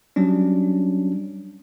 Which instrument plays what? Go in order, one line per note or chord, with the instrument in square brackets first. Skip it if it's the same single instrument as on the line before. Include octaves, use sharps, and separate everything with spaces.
[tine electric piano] F#3 G3 C#4 D4